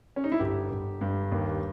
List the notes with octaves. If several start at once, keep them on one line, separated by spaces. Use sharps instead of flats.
C#4
D#4
E4
G1 G4
G1
G2
D#2